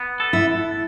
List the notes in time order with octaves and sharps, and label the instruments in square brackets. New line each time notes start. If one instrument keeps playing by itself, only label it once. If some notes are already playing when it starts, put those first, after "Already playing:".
Already playing: [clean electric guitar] B3
A4
[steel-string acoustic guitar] E4